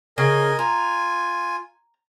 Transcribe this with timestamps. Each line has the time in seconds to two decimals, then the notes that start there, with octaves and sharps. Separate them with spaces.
0.18 C#3 A#4 D#5 G#5
0.59 F4 G#5 A#5